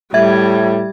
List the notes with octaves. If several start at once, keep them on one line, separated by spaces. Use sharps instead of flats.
A2 G3 E5 G#6